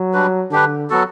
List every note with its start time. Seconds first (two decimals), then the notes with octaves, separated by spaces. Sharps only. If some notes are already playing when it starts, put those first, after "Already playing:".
Already playing: F#3
0.13 G3 D4 F#4 B4
0.51 D3 D4 G4 B4
0.90 F#3 B3 F#4 A4